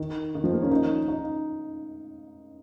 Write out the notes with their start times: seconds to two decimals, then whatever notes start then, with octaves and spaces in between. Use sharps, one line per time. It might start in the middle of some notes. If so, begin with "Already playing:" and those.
Already playing: D#3
0.35 D#3
0.44 F3
0.53 A#3
0.62 C#4
0.71 D#4
1.08 D#4